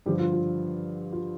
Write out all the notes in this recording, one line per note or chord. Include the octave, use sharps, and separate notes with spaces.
G2 D3 F3 G4
F4
F4
F4